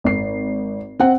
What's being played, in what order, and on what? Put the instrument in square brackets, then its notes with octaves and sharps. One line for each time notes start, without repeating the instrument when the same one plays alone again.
[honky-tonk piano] G#1 C7
[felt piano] C4 F#5